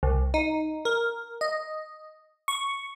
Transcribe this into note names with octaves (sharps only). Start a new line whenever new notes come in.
C2
D#4
A#4
D#5
C#6